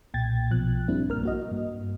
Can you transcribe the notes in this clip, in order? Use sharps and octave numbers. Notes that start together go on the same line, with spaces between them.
B1 A#2 G5 G#6 A6
B1 B2 F3 F#6
G2 G3 A#3 C4 D4 E4
A#1 A#4 F6
A#3 F#4 D#5
G2